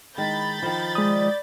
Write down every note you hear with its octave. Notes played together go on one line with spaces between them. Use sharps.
D#3 G#3 B5 G6 A6
D#3 F3
G#3 D5 D#6